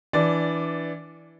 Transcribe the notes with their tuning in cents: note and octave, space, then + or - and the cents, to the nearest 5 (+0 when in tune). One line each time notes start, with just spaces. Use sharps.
E3 +0 D4 -20 D5 +0